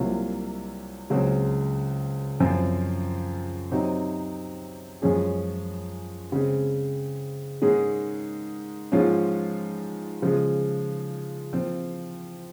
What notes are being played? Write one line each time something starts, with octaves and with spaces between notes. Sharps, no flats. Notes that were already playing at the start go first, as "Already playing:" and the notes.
Already playing: C2 C3 F#3 A#3 F4
C#2 C#3 F#3 C4
F#2 F3 C4 F4
C3 F#3 C4 D#4
F#2 F3 G#3 C#4 G#4
C#3 G#3 C4
G#2 D#3 G#3 C#4 G#4
G#2 F3 G#3 C#4 F4
C#3 F3 G#3
F3 C4 F4